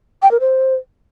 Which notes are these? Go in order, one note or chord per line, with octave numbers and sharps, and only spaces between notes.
G5
A#4
C5